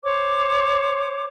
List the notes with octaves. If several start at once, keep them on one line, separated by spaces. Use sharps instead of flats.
C5 C#5 D6